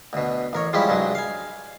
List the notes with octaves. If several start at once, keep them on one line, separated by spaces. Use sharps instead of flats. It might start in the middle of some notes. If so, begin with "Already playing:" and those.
D2 B2
A1 A#4 C#5
F3 G3 G#3 C#4 E4 G4
C2 G2 F#3 G#3
F5 G#5